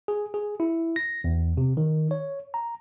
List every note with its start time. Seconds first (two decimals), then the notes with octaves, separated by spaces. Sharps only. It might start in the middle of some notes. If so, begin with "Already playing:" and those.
0.08 G#4
0.34 G#4
0.60 E4
0.96 A#6
1.24 E2
1.57 C3
1.77 D#3
2.11 C#5
2.54 A#5